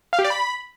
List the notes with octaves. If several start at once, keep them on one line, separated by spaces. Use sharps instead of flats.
F5
G4
D5
B5